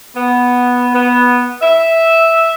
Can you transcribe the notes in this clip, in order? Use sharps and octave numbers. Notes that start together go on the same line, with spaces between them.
B3
B3
E5